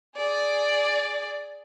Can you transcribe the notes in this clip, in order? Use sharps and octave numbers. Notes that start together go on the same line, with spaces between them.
G#4 D5